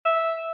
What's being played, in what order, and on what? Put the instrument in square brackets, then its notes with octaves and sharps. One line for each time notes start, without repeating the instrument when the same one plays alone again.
[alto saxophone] E5